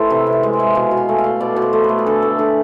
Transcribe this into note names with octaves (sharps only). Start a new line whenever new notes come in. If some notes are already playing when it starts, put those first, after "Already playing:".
Already playing: A2 E3 A3 C5
C3 E5
C3
E5
G#3
E5
G#3
B2 F5
B2
G#5
A3
F5
A3
B2 D5
B2
C5
A3
B4
A3
G#4
D3 A4
A3
D3 G#4